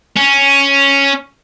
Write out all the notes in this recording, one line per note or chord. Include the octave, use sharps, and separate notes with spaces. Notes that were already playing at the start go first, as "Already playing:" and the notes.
C#4